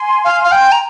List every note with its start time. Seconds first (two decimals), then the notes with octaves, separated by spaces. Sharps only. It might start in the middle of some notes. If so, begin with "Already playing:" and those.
Already playing: G#5 C6
0.24 F5
0.44 F5
0.52 G5
0.72 A#5